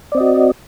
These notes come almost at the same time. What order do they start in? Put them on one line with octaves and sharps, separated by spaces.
D5 C4 D#5 F#4